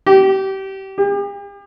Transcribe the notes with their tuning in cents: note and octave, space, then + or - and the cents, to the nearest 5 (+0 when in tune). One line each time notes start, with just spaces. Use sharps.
G4 -25
G4 +45